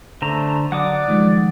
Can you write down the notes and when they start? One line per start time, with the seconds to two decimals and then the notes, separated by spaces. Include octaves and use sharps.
0.22 D3 A3 C5 A#5
0.72 D3 F#3 D5 F#5 D6 D#6
1.08 D#3 F3 G#3